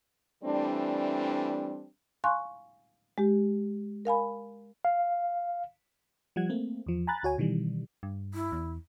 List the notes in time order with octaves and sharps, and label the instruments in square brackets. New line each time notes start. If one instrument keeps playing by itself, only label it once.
[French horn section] E3 G3 A3 C4 D4
[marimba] F5 G#5 C6 C#6 F#6
G#3 G4
A#4 F5 G#5 B5
[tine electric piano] F5
[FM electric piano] F3 G3 F#5 G#6
A3 A#3 C4
E2 F3
G#5 A#5 B5 F#6 A6
D2 F#4 C#5 G#5
B2 D#3 E3 G3
[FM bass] G2
[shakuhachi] E4
[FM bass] E2